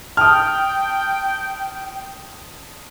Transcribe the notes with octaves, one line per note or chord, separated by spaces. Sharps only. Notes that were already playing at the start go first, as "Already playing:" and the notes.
G5 A5 D#6 F6